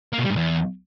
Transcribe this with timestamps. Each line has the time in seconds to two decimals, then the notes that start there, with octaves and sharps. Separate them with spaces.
0.13 A#3
0.19 B2
0.24 G3
0.30 G#2
0.36 E2